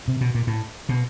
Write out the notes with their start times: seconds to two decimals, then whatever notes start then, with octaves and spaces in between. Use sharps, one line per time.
0.08 C3
0.21 B2
0.35 A#2
0.47 A2
0.89 B2